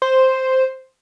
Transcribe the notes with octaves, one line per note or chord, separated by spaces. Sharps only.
C5